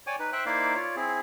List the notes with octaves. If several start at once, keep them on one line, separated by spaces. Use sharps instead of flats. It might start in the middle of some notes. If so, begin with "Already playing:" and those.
C#5 D5 G5 G#5 D6
D#4 B4
C5 E5 G5 F#6
A#3 D#4 E4 C5 D5 F5
F4 C#5 D5
C4 E4 G#4